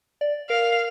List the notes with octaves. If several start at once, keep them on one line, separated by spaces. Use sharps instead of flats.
D5
A#4 F5